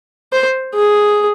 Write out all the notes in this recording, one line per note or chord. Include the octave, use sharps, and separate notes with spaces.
C5
G#4